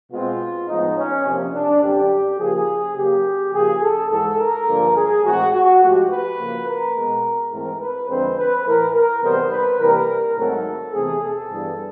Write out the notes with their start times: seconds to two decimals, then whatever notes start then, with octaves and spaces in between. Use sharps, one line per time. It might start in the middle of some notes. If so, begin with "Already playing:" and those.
0.11 B2 G#3 C4 F4
0.69 A2 F3 G#3 B3 D#4
0.97 C#4
1.25 C3 F3 A#3
1.54 D4
1.82 F#2 D3 G3 C4 G4
2.39 C#3 F3 A#3 G#4
2.96 C#3 F#3 A#3 G4
3.53 C#3 F3 A#3 G#4
3.82 A4
4.10 G#2 E3 G#3 A4
4.39 A#4
4.67 G2 D3 F3 A#3
4.95 G#4
5.24 A2 E3 G#3 C4 F#4
5.52 F#4
5.81 G#2 F3 A3 G4
6.10 B4
6.38 C#3 F3 A#3
6.67 A#4
6.95 B2 G#3 B3
7.52 G#2 E3 A3 C4 A#4
7.80 B4
8.09 F2 D3 F3 G#3 C4 C5
8.37 B4
8.66 A2 E3 A3 A#4
8.94 A#4
9.23 E2 C3 D#3 G3 B3 C5
9.51 B4
9.80 C3 E3 G3 A#3 A#4
10.37 G#2 D#3 F#3 A3 C4 A4
10.94 E2 C3 E3 A3 C4 G#4
11.22 A4
11.50 G2 E3 G3 B3